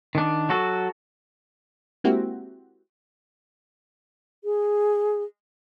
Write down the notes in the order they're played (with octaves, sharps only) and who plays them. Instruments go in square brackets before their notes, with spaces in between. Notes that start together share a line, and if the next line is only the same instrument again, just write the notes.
[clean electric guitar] D#3 D4
F#3 F#4 A4
[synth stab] G#3 A#3 C4 E4 F#4 G4
[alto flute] G#4